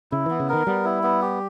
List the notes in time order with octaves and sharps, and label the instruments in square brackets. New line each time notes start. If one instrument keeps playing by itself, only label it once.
[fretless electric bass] C#3 [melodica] E4
[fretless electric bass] E3 [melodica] B3
[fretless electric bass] C#3
[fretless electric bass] D#3 [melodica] A#4
[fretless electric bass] G3 [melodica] B3
[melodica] E4
B3
G4